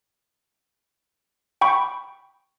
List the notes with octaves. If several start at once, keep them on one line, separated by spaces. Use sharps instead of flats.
G5 B5 C#6